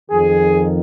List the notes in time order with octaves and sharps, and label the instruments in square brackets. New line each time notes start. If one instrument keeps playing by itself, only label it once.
[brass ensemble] F2 D#3 G#4